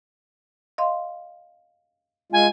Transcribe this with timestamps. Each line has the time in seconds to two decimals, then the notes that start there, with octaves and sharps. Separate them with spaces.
0.78 D#5 F5 C6
2.32 G#3 F4 G#5